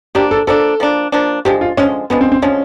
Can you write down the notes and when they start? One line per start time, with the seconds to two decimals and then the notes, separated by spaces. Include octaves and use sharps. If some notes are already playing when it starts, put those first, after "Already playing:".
0.15 F3 A#3 D4 G4
0.31 A4
0.47 F3 A#3 D4 A4
0.80 F3 A#3 D4
1.12 F3 A#3 D4
1.45 D3 F3 G#3 G4
1.61 F4
1.77 D3 F3 G#3 C#4
2.10 D3 F3 G#3 B3
2.21 C4
2.32 C4
2.42 D3 F3 G#3 C#4